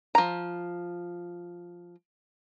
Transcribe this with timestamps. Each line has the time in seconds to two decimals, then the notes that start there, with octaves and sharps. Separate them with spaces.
0.15 F3 A#5